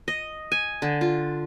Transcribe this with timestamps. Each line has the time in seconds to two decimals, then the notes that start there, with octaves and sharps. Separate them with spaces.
0.08 D#5
0.52 G#5
0.82 D3
1.01 F4